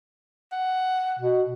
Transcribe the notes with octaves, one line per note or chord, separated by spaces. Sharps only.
F#5
B2